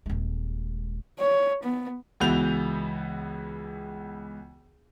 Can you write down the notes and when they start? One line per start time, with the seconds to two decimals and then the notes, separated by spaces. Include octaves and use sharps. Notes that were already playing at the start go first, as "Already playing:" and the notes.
0.06 D#1 G#3
1.20 C#5
1.64 B3
2.20 C#2 E3 B3 F#4 G6 F7